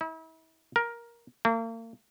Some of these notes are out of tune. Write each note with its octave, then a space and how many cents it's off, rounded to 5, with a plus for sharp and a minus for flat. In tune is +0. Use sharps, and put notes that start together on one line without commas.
E4 -40
A#4 +10
A#3 -40